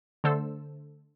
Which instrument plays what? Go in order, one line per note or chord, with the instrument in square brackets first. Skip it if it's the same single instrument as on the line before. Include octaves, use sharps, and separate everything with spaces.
[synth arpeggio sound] D3 A3 A4 C5 E6